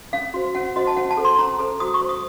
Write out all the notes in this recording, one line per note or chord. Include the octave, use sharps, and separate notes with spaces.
C#4 F5
F#4 C5
C#4 F#5
F#4 C5 D#5
A5
C#4 F#5
A5
A4 C5
C6
C#4 A#5
A4 C5
F#4 D#6
C#6
C5
D#6